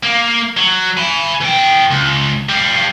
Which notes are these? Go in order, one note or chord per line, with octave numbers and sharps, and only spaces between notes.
A#3
F#3
G#5 B5
E3 G5
C#2
G3 F5